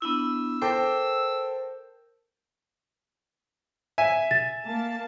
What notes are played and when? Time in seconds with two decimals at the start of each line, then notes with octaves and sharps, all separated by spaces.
0.02 B3 D4 E4 E6
0.62 A4 A#4 C5 G5 D6
3.98 E5 G#5
4.31 A6
4.66 A#3 A5